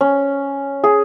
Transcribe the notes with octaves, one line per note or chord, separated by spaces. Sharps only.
C#4
G#4